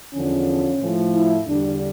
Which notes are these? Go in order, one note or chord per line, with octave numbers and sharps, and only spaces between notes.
E2 D3 F3 C#4
A2 F3
E4
E2 D3 G3 D4